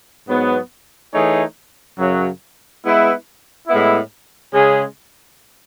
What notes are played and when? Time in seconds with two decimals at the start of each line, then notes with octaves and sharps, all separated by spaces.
0.28 G#2 F#3 B3
1.13 E3 A3 D#4 G#4 C#5
1.98 F#2 C#3 F#3
2.83 G#3 B3 E4 B4
3.68 A2 G#3 B3 E4
4.53 C#3 G#3 C#4 G#4